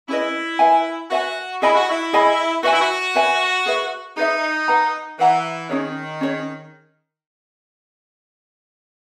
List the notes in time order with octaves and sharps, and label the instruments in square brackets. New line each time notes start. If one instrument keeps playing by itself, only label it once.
[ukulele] C#4 G#4 B4 D#5 [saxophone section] E4
[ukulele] B4 E5 G#5
[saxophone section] F#4 [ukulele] B4 E5 G#5
[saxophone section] E4 [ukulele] G#4 D#5 G#5 B5
[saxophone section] F#4
E4
[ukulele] G#4 D#5 G#5 B5
[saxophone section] F#4 [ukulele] B4 E5 G#5
[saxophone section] E4
F#4
[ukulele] B4 E5 G#5
G#4 B4 E5
[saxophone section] D#4 [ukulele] G#4 B4 E5
[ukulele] B4 F#5 A#5
[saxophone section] E3 [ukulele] B4 F#5 A#5
[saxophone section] D#3 [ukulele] C#4 G#4 C#5
[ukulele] C#4 G#4 C#5